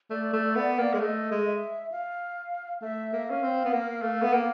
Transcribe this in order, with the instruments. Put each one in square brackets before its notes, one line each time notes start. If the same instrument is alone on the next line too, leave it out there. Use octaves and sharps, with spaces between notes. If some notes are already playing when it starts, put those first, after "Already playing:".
[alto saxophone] A3 [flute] D5
[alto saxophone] A3
B3
A#3
G#3
[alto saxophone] A3 [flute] D#5
[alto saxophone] G#3
[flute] E5
F5
[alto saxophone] A3 [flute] E5
[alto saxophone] A#3
[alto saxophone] C#4 [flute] F5
[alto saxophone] C4
B3
A#3
A3
B3
A#3